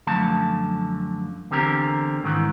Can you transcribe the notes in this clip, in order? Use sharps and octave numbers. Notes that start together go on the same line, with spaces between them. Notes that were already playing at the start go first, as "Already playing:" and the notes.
F#2 D3 F3 A3 A5
E2 D3 C4 G4 A4 A#4
G#2 D#3 E3